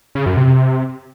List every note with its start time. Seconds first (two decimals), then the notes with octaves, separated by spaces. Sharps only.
0.15 C#3
0.26 F#2
0.37 C3